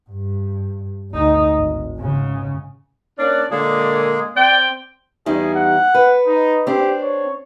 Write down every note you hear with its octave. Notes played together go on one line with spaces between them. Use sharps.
G2
D2 D#4
G#1
G#2 C#3
A#3 C#4 D4 D5
A#2 D3 G#3 A#3 G#4
C4 D5 G5
E2 G3 D#4 G#4
F#5
B4
D#4
C4 D4 G4
C#5